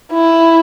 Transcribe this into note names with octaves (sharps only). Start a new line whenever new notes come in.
E4